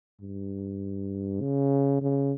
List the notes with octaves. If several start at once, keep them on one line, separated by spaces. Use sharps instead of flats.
G2
C#3
C#3